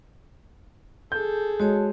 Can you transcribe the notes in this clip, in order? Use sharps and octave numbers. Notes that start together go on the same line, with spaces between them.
G#4 A4 G6
G#3 F#4 C#5 A5